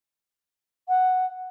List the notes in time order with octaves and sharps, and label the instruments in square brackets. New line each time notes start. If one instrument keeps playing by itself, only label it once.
[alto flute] F#5